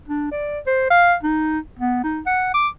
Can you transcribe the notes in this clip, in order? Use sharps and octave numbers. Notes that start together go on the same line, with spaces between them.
D4
D5
C5
F5
D#4
B3
D#4
F#5
D6